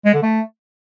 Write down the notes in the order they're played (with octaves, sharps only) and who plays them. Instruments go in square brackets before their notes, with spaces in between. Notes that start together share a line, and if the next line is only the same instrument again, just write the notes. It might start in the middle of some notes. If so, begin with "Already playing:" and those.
[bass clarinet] G#3
D3
A3